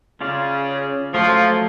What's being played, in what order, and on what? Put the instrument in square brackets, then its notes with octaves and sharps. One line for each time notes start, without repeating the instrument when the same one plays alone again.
[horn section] C#3 [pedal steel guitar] C#4 F4 G#4 D5 F5
[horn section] F3 [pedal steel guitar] F#3 A3 F4 A4 C#5